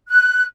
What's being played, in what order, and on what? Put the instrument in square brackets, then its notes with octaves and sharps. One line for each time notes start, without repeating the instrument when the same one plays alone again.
[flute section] F#6